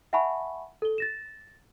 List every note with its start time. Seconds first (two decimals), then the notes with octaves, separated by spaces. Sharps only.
0.13 E5 F#5 G#5 A5 B5 C#6
0.82 A4 G7
0.98 A6 A#6 E7